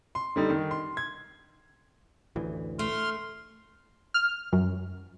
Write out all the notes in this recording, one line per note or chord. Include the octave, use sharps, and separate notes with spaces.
C6
D3 G3 D#4
D#3
C6
G#6
A1 D2 E3
A3 C6 F6
F6
F#2